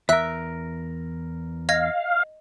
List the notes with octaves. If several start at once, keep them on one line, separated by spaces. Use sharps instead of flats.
E2 A#4 E5 E6 F#6 B6
D#5 F5 G#6 A#6